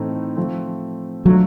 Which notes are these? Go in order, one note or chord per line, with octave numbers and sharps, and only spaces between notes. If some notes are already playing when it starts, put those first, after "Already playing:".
Already playing: A2 E3 A3 C4 D#4
F3 A3 C4
F3 F#3 A3 D4